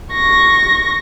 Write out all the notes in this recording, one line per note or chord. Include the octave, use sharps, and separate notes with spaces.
C#6 A#6